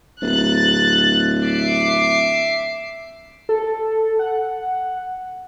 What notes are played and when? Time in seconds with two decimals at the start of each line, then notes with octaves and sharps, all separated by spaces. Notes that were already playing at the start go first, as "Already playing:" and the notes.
0.22 D1 F#6 A6
1.43 E5 D6 C7
3.49 A4
4.19 F#5